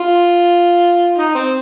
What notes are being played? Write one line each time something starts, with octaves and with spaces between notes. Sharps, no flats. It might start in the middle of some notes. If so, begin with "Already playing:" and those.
Already playing: F4
D#4
C4